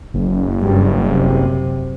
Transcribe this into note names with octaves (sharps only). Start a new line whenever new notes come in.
F#1
G2 G3
F#2 C3